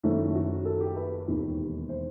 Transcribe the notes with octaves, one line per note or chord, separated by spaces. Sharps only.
F#1 F#2 D#3 A3
E4
F#4
A4
G4
B4
E1 D#2 D#3
C5